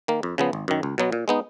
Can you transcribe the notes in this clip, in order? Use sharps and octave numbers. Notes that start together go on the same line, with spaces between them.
D#3 A#3
F2
C#3 F3 B3
G#1
F#2 D#3
C#2
B2 F#3 B3
A#2
G#3 B3 D#4